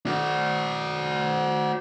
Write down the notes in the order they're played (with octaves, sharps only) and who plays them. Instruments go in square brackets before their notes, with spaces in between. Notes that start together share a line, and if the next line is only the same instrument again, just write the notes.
[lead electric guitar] F#4 D5